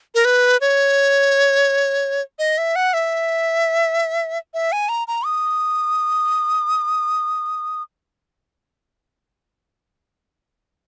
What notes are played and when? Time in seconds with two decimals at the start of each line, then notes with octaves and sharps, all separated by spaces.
0.15 A#4
0.25 B4
0.61 C#5
2.39 D#5
2.58 E5
2.76 F#5
2.94 E5
4.54 E5
4.72 G#5
4.89 A#5
5.08 A#5
5.25 D#6